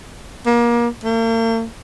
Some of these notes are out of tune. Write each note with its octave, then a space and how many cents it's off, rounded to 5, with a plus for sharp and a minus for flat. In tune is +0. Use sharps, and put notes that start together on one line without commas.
A#3 +30
A#3 -45